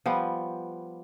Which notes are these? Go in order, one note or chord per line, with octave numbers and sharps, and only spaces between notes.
F3 G3 B3